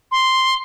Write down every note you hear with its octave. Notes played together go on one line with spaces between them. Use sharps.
C6